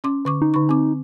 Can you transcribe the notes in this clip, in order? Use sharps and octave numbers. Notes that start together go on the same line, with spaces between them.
C#4 C6 D6
D3 C#6 D6
D#4
D3 C#6
C4 D6